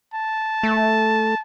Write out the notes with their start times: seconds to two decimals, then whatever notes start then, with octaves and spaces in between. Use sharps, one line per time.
0.14 A5
0.63 A3